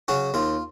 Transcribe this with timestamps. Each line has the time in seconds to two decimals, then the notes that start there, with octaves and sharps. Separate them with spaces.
0.08 C#3 F#3 C#4 F#4
0.34 D#2 F4